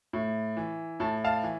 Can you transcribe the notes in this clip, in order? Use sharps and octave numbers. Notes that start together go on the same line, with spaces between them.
A2
E3
A2 A5
F5 A5
E3